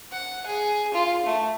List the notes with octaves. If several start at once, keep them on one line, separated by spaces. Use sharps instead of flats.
F#5
G#4
F4
A3